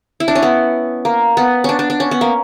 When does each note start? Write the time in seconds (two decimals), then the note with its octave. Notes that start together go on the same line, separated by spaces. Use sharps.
0.20 E4
0.28 D4
0.35 C#4
0.43 B3
1.05 A#3
1.37 B3
1.64 C#4 D4
1.79 D4
1.90 D4
2.00 C#4
2.11 B3
2.21 A#3